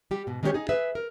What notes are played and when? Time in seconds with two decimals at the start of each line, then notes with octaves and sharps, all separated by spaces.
0.11 G3 G4
0.27 G#2 B2
0.43 D#3 G#3 C#4 D#4 G4 C#5
0.54 D#4 G#4
0.69 G#4 B4 E5
0.95 A#4